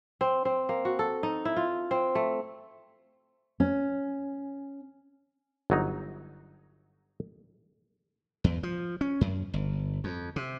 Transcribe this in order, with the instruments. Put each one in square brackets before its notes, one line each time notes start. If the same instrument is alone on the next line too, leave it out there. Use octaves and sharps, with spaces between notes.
[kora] C4
C4
A#3
F#4
A4
D#4
E4
F4
C4
A3
[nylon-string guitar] C#4
[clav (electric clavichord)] G1 F#3 D#4
[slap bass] E2
F3
C#4
F#2
G1
F2
C3